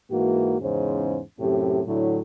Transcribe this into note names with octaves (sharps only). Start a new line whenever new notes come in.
G#2 E3 A#3 F#4
E2 G#2 C#3 C#4 C5
F#2 A2 C3 G4
A2 D3 F#3 A3 E4